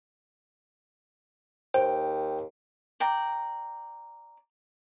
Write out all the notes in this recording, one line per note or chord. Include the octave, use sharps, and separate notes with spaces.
D#2 C5 G5
D5 G5 A#5